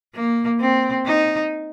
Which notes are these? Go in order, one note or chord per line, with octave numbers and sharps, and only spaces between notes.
A#3
C4
D#4